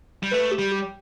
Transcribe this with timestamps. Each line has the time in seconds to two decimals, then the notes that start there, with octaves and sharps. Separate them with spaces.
0.23 G3
0.31 A3 B4
0.51 G4
0.59 G3
0.71 G4